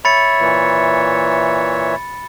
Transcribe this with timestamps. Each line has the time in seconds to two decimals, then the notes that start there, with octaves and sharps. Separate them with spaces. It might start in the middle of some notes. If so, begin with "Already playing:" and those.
0.05 C#5 E5 B5 A6 C#7
0.39 A#2 E3